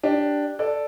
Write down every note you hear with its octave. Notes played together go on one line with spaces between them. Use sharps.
D4 G4
A4 D5